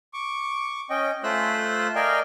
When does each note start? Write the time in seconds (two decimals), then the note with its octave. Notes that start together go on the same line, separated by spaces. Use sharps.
0.13 C#6 D6
0.90 C#4 D#5 G5
1.24 A3 F4 C5 E6 F#6
1.95 A#4 D5 D#5 F5 G5 G#5